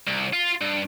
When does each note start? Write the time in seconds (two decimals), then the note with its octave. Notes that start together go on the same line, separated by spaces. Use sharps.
0.07 C2
0.33 F4
0.61 G2